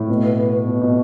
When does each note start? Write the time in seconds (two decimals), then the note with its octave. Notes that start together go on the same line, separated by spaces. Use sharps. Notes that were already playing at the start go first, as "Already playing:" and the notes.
Already playing: A2
0.09 B2
0.24 B3
0.39 B3
0.52 B3
0.67 B2
0.81 B2